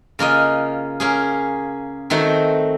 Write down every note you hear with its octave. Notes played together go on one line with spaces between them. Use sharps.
C#3 A#3 F4 D#5
A#3 C#4 G#4
D#3 A3 C4 F#4